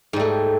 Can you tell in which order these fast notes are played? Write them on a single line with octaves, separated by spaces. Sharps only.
G#2 G3 A3